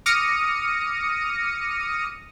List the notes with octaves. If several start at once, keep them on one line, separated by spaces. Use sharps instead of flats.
D6 D#6 F6 A#6 C#7 D#7